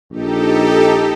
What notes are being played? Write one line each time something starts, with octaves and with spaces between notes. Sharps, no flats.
A#1 D#4 G4 A4